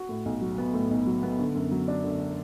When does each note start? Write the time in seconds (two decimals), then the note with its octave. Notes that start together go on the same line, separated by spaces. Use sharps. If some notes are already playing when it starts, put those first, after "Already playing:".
Already playing: F#4
0.09 A2
0.25 B1
0.42 F#3
0.58 B3
0.74 A2
0.91 B1
1.07 F#3
1.23 B3
1.39 D3
1.55 F#2
1.72 F#3
1.88 D4
2.04 D3